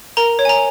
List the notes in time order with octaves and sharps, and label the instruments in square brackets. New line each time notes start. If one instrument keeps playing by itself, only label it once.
[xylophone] A#4 A#5
C#5
G#5
A#5